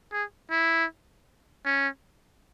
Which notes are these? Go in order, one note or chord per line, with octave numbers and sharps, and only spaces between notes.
G#4
E4
C#4